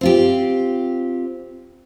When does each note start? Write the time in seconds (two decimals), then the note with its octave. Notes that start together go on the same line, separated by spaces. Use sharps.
0.01 C4 F4 G4